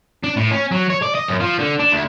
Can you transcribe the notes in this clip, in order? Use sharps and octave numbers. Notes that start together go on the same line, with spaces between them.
D4
A2
C#4
F#3
C#5
D5
D#5
F#2
F3
D3
D4
D2